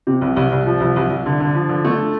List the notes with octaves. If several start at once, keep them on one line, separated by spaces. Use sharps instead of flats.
C3
C2
C2
C2
F3
C2
C2
C2
D3
D3
F3
D3
A3